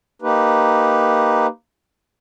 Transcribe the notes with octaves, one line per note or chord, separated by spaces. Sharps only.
A#3 D#4 G4 B4